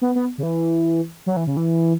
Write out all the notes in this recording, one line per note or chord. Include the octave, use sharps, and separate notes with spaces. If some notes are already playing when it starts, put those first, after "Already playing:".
B3
B3
C#3
E3
F#3
E3
C#3
E3